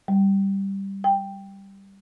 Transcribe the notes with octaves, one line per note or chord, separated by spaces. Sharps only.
G3
G5